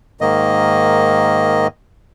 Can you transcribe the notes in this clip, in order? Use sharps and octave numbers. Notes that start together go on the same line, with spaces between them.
G#2 D#3 A#3 D#5